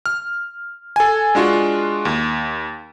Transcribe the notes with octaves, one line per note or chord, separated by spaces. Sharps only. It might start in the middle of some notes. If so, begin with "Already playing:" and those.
F6
A4 G#5
G#3 D4 F4 F#4
D#2